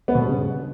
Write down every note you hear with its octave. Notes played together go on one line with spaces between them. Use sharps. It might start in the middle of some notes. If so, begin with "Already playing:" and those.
B3
B2
G2
C#3